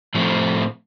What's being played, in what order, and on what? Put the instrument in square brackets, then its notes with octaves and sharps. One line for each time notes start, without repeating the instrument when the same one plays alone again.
[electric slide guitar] A2 F3 A3 C4